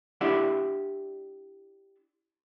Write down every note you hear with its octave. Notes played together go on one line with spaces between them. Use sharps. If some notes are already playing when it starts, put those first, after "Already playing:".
D4 E4 G4 D5 E5 F#5